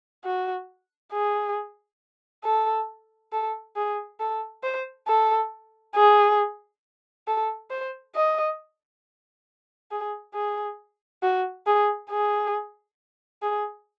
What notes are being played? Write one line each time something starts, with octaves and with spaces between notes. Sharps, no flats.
F#4
G#4
A4
A4
G#4
A4
C5
A4
G#4
A4
C5
D#5
G#4
G#4
F#4
G#4
G#4
G#4